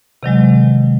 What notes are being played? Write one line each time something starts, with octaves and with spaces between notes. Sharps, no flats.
C3 D#3 F#3 G#3